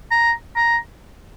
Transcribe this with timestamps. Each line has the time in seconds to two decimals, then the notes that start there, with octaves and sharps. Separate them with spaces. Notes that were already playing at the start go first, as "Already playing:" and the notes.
0.11 A#5
0.56 A#5